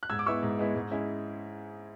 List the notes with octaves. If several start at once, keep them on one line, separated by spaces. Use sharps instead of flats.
F#6
G#2 E6 G#6
D6
G#3 B3 E4 C#6 E6
G#2
G#3 B3 E4
G#2
G#3 C#4 E4